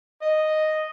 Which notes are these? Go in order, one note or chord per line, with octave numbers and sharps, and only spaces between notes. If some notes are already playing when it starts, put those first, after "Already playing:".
D#5